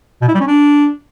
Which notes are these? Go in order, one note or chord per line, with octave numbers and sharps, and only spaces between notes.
B2
E4
G3
C#4
D4